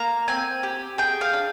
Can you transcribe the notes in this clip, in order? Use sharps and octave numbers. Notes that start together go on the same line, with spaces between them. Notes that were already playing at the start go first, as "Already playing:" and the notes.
Already playing: A#3 A#5
C4 G#5
G4
G#4 G5
F5
D4